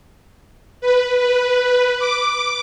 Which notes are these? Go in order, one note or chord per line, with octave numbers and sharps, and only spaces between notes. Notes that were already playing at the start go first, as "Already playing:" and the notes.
B4
B4
D6